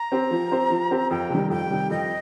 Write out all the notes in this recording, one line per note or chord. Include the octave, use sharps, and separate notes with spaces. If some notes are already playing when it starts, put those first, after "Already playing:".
Already playing: A#5
C4 G4 C5
F3
C4 G4 C5
F3
C4 G4 C5
F2 G5
C3 D#3 G3
F2 G5
C3 D#3 G3
F2 D#5